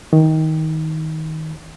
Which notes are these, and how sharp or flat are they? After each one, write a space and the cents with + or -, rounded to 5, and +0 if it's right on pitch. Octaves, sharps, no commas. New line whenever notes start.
D#3 +20